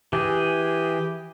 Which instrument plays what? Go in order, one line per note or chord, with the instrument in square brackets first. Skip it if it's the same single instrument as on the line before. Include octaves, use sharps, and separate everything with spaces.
[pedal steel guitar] E3 G#4 [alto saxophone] G4